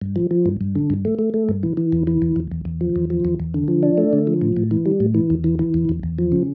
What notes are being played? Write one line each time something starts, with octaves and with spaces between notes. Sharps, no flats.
G2
F3
F3
G2
G2
D3
G2
A3
A3
A3
G2
E3
E3
E2
E3
E2
E2
E2
E2
F3
E2
F3
E2
E2
D3
F3
D4
A3
D3
F3
A2
A2
E3
G3
A2
E3
E2
E3
E3
E2
E2
E2
F3
C#3